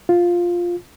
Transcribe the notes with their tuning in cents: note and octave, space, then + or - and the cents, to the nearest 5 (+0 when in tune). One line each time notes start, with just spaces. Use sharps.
F4 +5